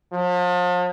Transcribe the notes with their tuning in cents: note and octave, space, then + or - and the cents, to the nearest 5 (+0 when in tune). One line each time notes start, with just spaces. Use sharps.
F3 +40